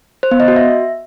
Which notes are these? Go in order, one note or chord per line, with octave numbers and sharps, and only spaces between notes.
C5
B3
D#5
F#4
E5